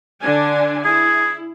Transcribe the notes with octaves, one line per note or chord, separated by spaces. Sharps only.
D3 D4 G#5
E4 G#4